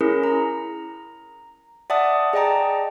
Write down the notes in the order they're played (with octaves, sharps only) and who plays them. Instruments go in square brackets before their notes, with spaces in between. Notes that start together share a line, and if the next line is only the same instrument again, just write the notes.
[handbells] C#4 E4 G#4 A#4
A#5
D5 E5 F#5 A5 D#6
G#4 D5 D#5 G5 A5 A#5